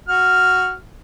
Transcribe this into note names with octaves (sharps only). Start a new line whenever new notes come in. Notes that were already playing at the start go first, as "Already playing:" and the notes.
F#4 F6